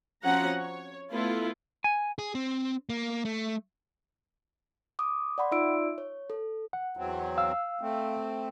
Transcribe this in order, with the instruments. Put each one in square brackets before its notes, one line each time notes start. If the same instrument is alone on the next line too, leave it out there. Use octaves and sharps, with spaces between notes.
[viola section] F3 C4 C#4 F#4 F#5 A#5
C#5
A3 B3 E4 F4 A4
[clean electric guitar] G#5
[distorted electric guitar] G#4
C4
A#3
A3
[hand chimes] D6 D#6
D5 F#5 B5 C6
D#4 F4 D5 E5 E6 D7
C#5
A4
[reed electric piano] F#5
[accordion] E2 F#3 C4
[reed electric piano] F5 E6
[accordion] A3 C4